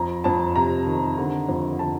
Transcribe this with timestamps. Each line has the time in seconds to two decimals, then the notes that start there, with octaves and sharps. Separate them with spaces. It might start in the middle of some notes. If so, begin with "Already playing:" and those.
Already playing: F2 A#5
0.24 F2 A5
0.56 C3 A#5
0.86 D#3
1.18 D3
1.49 F2
1.79 D3 A5